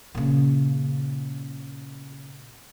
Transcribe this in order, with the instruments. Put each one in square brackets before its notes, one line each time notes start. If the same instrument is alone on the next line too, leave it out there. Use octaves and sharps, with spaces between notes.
[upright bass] A#2 C#3